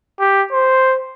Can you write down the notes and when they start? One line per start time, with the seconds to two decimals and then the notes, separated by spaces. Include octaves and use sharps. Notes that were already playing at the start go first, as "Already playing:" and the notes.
0.20 G4
0.52 C5